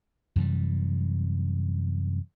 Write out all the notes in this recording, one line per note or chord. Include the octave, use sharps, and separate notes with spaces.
F#2 C3 E3 G3